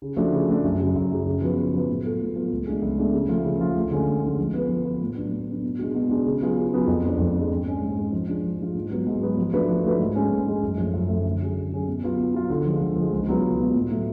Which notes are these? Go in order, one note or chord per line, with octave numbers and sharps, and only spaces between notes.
C#3
F3 A3 D4 F#4
C#3
F3 A3 D4 F#4
F#2
C#3 F#3
F#2
C#3 F#3
C#3
F3 B3 F#4 B4
C#3
F3 B3 F#4 B4
A2
F#3 B3 F4 A4
A2
F#3 B3 F4 A4
C#2
B2 A3 D4 G#4
C#2
B2 A3 D4 G#4
C#3
F3 A3 F4
C#3
F3 A3 F4
D2
D3 G#3 C#4
D2
D3 G#3 C#4
F3
B3 F4 B4
F3
B3 F4 B4
A2
F#3 B3 D4
A2
F#3 B3 D4
B2
G#3 D4 F#4
B2
G#3 D4 F#4
C#3
F#3 B3 F4 G#4
C#3
F#3 B3 F4 G#4
F2
F3 G#3 D4
F2
F3 G#3 D4
G#2
G#3 C#4 G#4
G#2
G#3 C#4 G#4
F3
G#3 D4 F4
F3
G#3 D4 F4
G#2
F#3 B3 F#4
G#2
F#3 B3 F#4
F3
A3 D4 F#4 B4
F3
A3 D4 F#4 B4
G#2
G#3 C#4
G#2
G#3 C#4
F#2
F3 A3
F#2
F3 A3
D3
F#3 C#4 G#4
D3
F#3 C#4 G#4
B2
F#3 B3 F4
B2
F#3 B3 F4
D3
F3 G#3
D3
F3 G#3
C#2
B2 F#3 B3 F4
C#2
B2 F#3 B3 F4
A2
F#3 A3